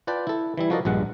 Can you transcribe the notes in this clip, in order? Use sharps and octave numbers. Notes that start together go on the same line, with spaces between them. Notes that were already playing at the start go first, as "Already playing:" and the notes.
F4 B4 D5 G5 A5
E4 A4
E3 G3 E4
F3 F#4 A4 A#4 D5 D#5
A#1 G2 G#3 F#5